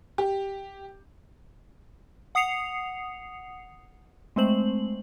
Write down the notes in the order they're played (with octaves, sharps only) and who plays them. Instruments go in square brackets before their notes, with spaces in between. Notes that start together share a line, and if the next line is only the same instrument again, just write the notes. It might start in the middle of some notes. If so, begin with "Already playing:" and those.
[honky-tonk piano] G4
[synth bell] F#5 D#6 C7 C#7 F7
G#3 A3 C4 C5 F#7